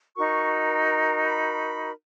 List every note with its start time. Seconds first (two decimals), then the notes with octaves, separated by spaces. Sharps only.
0.15 D#4 F#4 A#4 C#6
1.25 B5